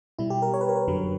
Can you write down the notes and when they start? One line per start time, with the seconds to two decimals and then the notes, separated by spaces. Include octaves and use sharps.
0.19 B2 G3 E4
0.30 G4
0.42 A#4
0.54 C#5
0.61 B4
0.69 A#4
0.76 B4
0.88 F#2 D3 F#3